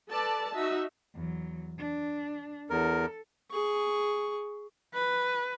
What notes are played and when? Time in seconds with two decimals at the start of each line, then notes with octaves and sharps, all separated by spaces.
0.11 A4 B4 D5 A5
0.54 D#4 F#4 E5
1.15 E2 F#3
1.78 D4
2.70 E2 A4 A#4
3.51 G#4 C#6
4.94 B4